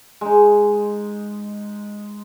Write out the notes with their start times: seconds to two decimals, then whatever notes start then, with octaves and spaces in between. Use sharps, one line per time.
0.21 G#3 D#4